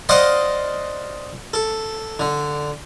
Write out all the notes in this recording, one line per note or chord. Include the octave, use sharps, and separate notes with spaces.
C5 D5 D#5 F5 F#5
A4
D3